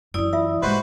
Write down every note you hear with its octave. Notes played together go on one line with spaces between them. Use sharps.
F#2 E3 E4 D5 D#6
F4 E5 E6
A2 G#3 F#4 G4 B4 C5 D#5